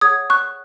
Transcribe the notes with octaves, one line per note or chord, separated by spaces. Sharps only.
G#4 C#5 F#5 D#6 G#6
C#6 F#6